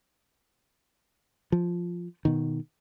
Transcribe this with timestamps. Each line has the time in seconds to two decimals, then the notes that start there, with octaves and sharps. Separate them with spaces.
1.52 F3
2.25 B2 D#3